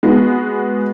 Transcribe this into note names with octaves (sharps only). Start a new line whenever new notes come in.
G#3 B3 F#4